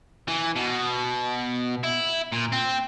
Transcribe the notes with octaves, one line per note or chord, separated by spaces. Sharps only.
E3
B2
E4
A#2
C4